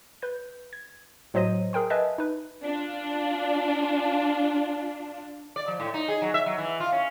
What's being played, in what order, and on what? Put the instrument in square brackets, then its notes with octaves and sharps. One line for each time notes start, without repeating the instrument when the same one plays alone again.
[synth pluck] B4 G6
G#6
A2 F#3 C5 D#5 A#6 D#7
G#4 A#4 G5 C6
B4 D#5 E5 G#5 A5
D#4 B4
[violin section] D4 F4
[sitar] D5
F3
A2
D#4
G#4
F#3
E5
F#3
E3
F4
C#4